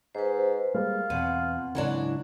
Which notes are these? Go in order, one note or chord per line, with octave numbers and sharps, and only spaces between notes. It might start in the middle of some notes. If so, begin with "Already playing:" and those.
G#2 B4 C5
G3 G#3 A#3 F4
E2 B2 C4 F#5
G#2 C#3 E3 F#3 D4